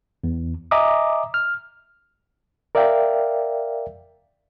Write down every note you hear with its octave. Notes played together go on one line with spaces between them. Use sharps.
E2
D#5 E5 G#5 A#5 D6 D#6
F6
A#4 D5 E5 F5 G5